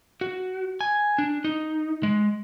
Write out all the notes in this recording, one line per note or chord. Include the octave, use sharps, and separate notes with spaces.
F#4
G#5
D4
D#4
G#3